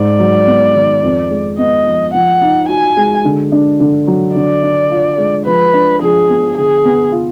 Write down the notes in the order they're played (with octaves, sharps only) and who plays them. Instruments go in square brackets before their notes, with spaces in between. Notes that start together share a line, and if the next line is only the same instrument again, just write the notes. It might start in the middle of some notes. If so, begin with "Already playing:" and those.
Already playing: [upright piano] G#2 [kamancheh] D5
[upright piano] F#3
B3
D#3
F2
G#3
[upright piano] B3 [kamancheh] D#5
[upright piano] F3
[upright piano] F3 [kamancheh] F#5
[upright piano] D#4
[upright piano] F#4 [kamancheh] G#5
[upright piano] G#3
D3
D4
D3
F#3
[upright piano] D3 [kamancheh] D5
[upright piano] D4
F4
G#3
[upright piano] F3 [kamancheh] B4
[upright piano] D4
[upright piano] F3 [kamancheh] G#4
[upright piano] B3
[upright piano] D3 [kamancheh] G#4
[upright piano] B3
F4